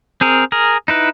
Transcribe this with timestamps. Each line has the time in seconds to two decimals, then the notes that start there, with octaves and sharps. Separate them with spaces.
0.21 C4 G#4 A#4
0.52 G#4 A#4
0.88 D#4 E4 B4